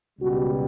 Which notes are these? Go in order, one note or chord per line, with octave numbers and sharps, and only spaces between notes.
C#2 B2 G3 F#4